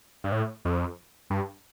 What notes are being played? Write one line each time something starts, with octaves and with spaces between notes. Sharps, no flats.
G2
A2
F2
G2